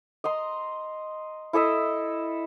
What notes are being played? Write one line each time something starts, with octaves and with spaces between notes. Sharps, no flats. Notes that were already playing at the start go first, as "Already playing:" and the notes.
D#5 A#5 C6
E4 A4 D#5 E5